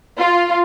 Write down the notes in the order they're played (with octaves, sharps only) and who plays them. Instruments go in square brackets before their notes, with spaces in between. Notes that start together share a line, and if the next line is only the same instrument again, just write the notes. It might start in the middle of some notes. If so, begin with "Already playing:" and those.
[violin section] F4